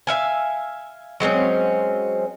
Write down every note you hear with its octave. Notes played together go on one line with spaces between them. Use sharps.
E5 F5 G#5
F#3 G#3 C4 C#4